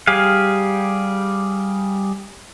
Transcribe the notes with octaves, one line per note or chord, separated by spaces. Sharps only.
G3 G4 G#4 F5